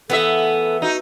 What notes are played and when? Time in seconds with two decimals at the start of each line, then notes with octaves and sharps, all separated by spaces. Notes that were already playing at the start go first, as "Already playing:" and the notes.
0.10 E3 A3 B3 A4 E5 F#5
0.82 D#4 F#4